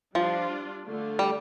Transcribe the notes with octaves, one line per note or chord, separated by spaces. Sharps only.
F3 G3 D4 F4
D3 A3 F4
G3